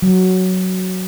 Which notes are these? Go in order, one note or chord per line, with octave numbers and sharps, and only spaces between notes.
F#3